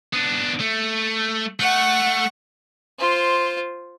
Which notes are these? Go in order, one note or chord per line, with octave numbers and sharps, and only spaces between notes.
B3 D4
A3
A3 F#5 C#6
F4 C5